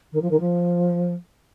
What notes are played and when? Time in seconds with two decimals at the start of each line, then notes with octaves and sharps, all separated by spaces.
0.12 D#3
0.21 F3
0.30 D#3
0.40 F3